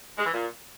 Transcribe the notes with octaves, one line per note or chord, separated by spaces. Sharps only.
G#3
E3
A#2